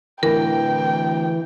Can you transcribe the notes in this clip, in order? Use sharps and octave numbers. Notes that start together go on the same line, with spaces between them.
A2 D3 E3 A#4 G5